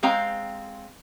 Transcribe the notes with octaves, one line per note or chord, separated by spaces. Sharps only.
G#3 C4 F5 G5 A#5